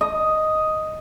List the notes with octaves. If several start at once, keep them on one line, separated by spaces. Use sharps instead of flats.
D#5